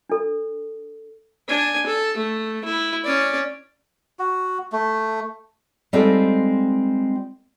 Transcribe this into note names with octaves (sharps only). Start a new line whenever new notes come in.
D4 A4
D4 G#5
A4
A3
E4
C#4 D5
F#4
A3
G3 G#3 C4 D#4 F4 A4